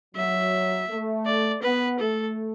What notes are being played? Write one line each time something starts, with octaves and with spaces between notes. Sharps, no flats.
F#3 E5
A3
D5
B3 B4
A3 A4